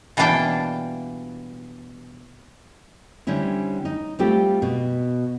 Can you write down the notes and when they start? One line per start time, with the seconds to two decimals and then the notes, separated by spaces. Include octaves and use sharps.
0.17 B2 E3 G3 A#3 D4 G5
3.27 D3 G3 C4 C#4 E4
3.85 D#4
4.19 G3 A3 C4 F4 G4
4.62 B2